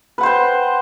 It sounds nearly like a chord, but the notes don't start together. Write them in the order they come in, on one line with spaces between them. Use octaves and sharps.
B4 F#5 C5 G5